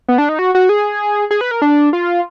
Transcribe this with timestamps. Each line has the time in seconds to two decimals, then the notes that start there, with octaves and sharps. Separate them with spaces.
0.09 B3
0.18 D4
0.29 D#4
0.39 F#4
0.55 F#4
0.69 G#4
1.31 G#4
1.41 B4
1.51 A#4
1.62 D4
1.93 F4